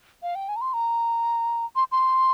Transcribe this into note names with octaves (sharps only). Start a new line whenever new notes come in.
F5
G5
G#5
A#5
C6
A#5
C6
C6